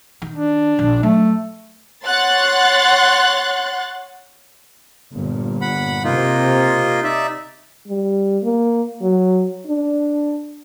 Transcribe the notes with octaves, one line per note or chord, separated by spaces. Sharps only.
D#3
D4
A#1
F#3 A3
C#5 F#5 C6 F#6 A6
G1 A#2
F#5 B5
C3 A#3 C4 D#4 F4
D#4 D5 E5
G3
A#3
F#3
D4